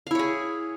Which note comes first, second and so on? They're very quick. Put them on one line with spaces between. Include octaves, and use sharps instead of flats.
F5 E4 C#5 G#4